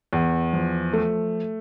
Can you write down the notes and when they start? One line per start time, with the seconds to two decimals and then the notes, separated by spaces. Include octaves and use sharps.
0.13 E2
0.53 F3
0.93 A3